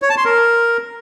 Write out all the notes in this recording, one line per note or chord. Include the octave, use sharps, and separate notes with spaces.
C#5
A5
C6
A#4